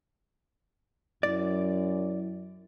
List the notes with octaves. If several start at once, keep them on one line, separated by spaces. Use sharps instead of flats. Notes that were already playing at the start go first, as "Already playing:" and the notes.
F#2 F#3 E4 D5